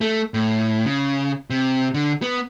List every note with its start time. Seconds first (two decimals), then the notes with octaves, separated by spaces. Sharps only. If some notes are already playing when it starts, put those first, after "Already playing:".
0.01 A3
0.34 A2
0.86 C#3
1.50 C3
1.94 D3
2.22 B3